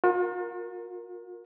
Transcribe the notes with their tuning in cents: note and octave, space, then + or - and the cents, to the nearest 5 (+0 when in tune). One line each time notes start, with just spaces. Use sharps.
F4 +45 A#4 +0